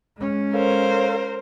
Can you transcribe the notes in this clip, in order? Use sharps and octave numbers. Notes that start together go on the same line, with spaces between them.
G#3 C#4
A4 A#4 C5 C#5 F5